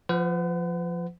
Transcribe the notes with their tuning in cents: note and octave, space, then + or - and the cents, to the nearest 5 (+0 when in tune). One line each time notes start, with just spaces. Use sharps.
F3 +0 B4 +45 F#5 +0